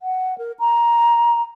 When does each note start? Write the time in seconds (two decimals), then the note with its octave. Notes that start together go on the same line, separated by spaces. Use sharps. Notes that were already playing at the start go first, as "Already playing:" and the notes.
0.01 F#5
0.38 A#4
0.60 A#5